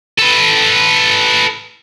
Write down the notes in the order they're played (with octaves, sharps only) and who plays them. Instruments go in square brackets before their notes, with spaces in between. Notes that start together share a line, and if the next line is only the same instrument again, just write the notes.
[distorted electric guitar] A4 B4